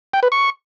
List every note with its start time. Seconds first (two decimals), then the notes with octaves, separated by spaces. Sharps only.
0.14 G5
0.23 B4
0.32 C#6